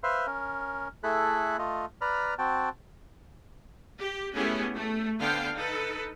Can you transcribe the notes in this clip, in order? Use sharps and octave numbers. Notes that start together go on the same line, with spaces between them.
B4 C5 E5 F5 C6
C#4 A#4
A3 E4 G#4 A4 B5 F#6
A3 F4 D#5
B4 D5 A#5 B5 F6
C4 F#4 G5 A5
G4
A3 B3 C#4 E4 G4 G#4
A3
D3 B3 C5 F5 G5
D#4 A4 B4